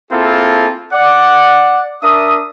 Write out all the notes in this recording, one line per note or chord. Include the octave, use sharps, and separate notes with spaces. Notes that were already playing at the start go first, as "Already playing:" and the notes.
A#3 C4 E4 F4 G#4 A4
D5 F#5
D4 A#4 E5 D#6